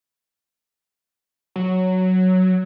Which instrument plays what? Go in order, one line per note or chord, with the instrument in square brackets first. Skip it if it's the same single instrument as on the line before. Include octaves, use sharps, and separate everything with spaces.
[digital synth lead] F#3